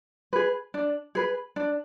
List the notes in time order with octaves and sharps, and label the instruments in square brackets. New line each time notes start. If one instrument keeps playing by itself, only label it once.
[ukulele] G#4 B4
D4
G#4 B4
D4